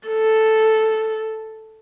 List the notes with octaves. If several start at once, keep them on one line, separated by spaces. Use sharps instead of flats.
A4